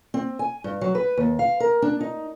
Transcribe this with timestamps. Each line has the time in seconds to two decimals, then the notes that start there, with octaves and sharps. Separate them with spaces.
0.14 C4
0.39 G#5
0.64 G2
0.81 F#3
0.95 B4
1.17 D#2
1.39 F5
1.60 A#4
1.82 D4
2.00 D#4